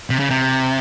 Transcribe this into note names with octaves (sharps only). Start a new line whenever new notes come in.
C3
C#3
C3